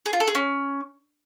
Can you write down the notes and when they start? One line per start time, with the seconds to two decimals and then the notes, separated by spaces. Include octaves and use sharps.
0.06 G#4
0.13 F4
0.20 A4
0.28 G#4
0.35 C#4